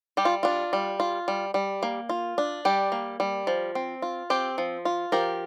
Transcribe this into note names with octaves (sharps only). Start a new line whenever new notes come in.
G3 G4
F4
D4 F4
G3
F4
G3
G3
A#3
F4
D4
G3 G4
A#3
G3
F3
C4
F4
C4 G4
F3
F4
F3 G4 A#4